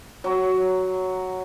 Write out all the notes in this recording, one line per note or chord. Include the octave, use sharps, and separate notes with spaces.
F#3